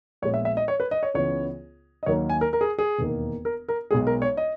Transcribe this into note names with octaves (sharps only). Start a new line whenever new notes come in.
A#1 A#2 G#3 B3 C#5
E5
E5
D#5
C#5
B4
D#5
C#5
C#2 C#3 E3 B3 C#5
D#5
D#2 D#3 F#3 A#3 C#5
G#5
A#4
A#4
G#4
G#4
E1 D#2 D#3 A#3
A#4
A#4
B1 B2 G#3 B3 G#4
A#4
C#5
D#5